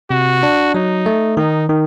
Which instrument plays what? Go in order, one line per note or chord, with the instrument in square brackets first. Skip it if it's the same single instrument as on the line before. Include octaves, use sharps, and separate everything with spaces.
[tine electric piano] C3 [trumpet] F#4
[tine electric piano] D4
[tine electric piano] F#3 [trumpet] D#4
[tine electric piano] A3
[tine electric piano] D#3 [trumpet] D#4
[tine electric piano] D#3